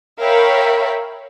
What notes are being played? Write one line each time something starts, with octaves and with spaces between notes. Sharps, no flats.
A#4 C#5 E5 F5 G5 B5